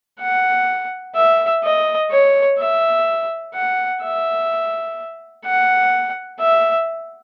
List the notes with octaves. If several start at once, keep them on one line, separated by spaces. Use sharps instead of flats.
F#5
E5
D#5
C#5
E5
F#5
E5
F#5
E5